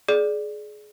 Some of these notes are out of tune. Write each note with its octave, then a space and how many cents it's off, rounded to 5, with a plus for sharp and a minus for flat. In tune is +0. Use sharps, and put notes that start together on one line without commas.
G#4 +25 D5 +0